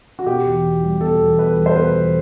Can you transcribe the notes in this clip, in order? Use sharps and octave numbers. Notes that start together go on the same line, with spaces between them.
F#4
B2 G4
E2
E2
G3
B2 A4
E2
E2 B4
G3
C5
B2 B4
E2